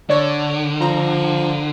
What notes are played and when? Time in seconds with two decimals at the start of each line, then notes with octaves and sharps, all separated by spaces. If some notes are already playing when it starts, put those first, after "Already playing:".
0.09 D3 C#5 D5
0.81 F3 A#5